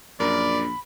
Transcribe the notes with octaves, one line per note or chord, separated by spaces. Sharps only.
A#1 F#2 A#4 D5 B5